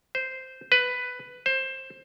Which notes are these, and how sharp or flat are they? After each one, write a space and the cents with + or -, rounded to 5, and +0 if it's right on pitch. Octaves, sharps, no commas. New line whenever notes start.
C5 -5
B4 +10
C5 +20